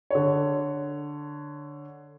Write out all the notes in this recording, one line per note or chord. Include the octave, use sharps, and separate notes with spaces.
D3 C#5